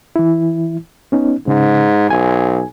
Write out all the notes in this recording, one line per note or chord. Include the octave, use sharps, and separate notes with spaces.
E3 E4
B3 C#4 D#4
G#2 C#3
B1 G#5